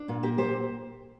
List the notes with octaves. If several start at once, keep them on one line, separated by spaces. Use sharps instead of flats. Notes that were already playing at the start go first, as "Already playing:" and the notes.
Already playing: D4
A#2 F4
A#3 G4
A#2 G4 C5